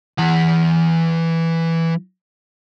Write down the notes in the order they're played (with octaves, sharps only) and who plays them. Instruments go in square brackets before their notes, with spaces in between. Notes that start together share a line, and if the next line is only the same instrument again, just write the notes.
[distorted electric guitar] E3 F#5